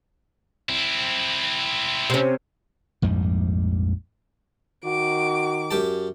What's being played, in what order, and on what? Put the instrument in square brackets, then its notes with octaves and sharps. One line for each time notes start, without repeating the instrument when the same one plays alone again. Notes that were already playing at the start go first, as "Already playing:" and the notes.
[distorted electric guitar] C4 E4
[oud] C3 C#4
[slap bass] A#1 F2 G#2 G3
[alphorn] D#3 [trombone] F#4 [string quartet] D6
[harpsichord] F#2 G4 A5